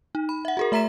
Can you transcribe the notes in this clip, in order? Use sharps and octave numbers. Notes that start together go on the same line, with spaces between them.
D#4
B5
E5 F#5
F#4 G#4 A#4
A3 E5 A#5 B6 E7